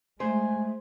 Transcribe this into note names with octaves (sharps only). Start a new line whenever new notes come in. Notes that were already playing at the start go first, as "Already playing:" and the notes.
G#3 A3 C5 G#5